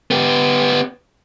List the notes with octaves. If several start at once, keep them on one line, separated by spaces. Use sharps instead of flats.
B3 G4